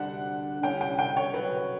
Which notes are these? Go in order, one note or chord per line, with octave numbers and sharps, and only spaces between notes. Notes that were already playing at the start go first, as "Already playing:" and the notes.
Already playing: D2 D3 G3 D4 F#5
E2 D3 G3 C#4 E4 G5
G5
G5
C#5
D2 C#3 F#3 B4